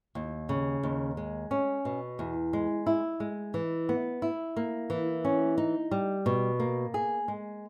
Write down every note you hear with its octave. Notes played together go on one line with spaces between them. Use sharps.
D#2
C#3
D#2
G#3
C#4
B2
E2
G#3
E4
G#3
E3
B3
E4
A#3
E3
C#4
D#4
G3
B2
A#3
G#4
G#3